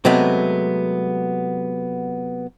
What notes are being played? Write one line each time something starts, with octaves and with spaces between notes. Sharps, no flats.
C3 F#3 G#3 A3 B3